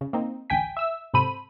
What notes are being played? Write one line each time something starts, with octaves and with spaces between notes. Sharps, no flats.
C#3
A#3 C4 D#4
A1 D2 G5 G#5 B6
E5 E6
G#2 C3 A4 C5 B5 D#7